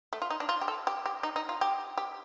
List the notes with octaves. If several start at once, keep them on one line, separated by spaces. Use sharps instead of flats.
A3
F4
D#4
D4
F4
G4
A4
G4
G4
D#4
D#4
F4
G4
G4